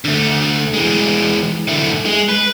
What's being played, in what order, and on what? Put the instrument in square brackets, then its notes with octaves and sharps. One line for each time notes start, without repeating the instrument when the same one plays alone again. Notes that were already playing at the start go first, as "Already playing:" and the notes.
[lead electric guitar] D3 A3
E3 G#3
D3 E4
G#3
B4